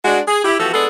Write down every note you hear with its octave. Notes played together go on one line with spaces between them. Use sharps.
G#3 D4 F#4
G#4
E4 G4
E3 F3 B3 F#4 G4 A4
G#3 B3 D4 G#4 A4